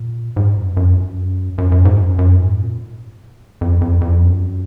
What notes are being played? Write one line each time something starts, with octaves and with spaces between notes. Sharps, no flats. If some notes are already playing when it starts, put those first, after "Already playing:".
Already playing: A#2
G#2
F#2
F#2
F#2
F#2
G#2
F#2
F#2
G#2
A#2
F2
F2
F2
F#2